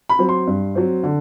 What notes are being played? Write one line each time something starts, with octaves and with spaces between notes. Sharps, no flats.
B5
F#3 C4
C6
G2
F#3 C4
D3